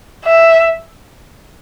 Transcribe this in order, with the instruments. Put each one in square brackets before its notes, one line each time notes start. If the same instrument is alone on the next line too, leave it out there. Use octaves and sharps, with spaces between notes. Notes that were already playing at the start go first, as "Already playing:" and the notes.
[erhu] E5